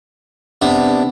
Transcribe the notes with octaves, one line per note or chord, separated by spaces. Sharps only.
C3 B3 D4